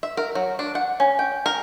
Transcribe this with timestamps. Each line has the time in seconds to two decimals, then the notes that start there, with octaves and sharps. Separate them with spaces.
0.03 E5
0.17 A#4
0.35 F#3
0.59 D4
0.75 F#5
1.00 C#4
1.19 G5
1.46 A#4